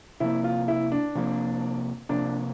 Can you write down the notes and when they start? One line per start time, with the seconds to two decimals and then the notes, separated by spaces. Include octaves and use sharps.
0.20 C3 F3 A#3 E4
0.44 F4
0.68 E4
0.92 D4
1.15 C3 F3 A#3
2.09 C3 F3 A#3 D4